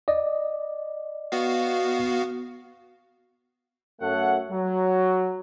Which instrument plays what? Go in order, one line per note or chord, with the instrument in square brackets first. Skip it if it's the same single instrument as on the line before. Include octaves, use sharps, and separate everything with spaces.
[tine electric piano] D5 D#5
[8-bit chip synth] B3 F#4 F5
[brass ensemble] F#2 A3 A4 C#5 F#5
F#3